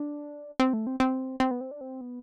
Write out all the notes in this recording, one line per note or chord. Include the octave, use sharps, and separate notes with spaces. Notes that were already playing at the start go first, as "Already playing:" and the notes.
Already playing: D4
C4
A3
C4
C4
C4
B3
C4
D4
C4
B3